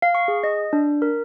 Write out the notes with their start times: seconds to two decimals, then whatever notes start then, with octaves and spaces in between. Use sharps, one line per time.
0.02 F5
0.15 C#6
0.28 G#4
0.44 D#5
0.73 D4
1.02 A#4